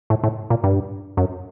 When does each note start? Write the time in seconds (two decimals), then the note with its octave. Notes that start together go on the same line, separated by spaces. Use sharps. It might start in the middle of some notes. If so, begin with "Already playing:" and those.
0.10 A2
0.24 A2
0.50 A#2
0.64 G2
1.17 F#2